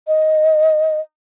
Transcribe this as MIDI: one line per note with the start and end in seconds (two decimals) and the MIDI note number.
0.07 1.00 75